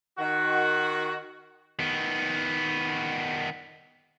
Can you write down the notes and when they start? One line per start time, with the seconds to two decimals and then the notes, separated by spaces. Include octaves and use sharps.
0.17 D#3 F#4
1.79 D#3 B3